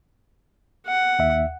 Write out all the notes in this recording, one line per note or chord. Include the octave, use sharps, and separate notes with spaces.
F#5
D#2 E5